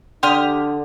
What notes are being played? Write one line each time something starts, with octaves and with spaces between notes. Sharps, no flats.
D3 D4 G4 D5 C6 D#6 F6